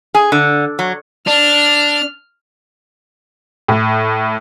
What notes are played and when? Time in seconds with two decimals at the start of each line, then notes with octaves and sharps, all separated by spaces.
0.15 G#4
0.32 D3
0.79 F#3
1.27 D4 F6
3.68 A2